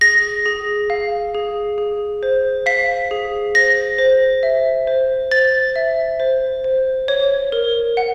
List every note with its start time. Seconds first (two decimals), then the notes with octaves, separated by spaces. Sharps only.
0.01 G#4 A#6
0.46 G#4
0.90 F5
1.35 G#4
1.78 G#4
2.23 C5
2.66 F5 B6
3.11 G#4
3.55 C5 A#6
3.99 C5
4.43 E5
4.87 C5
5.31 C5 A6
5.76 E5
6.20 C5
6.64 C5
7.08 C#5
7.52 A#4
7.97 F#5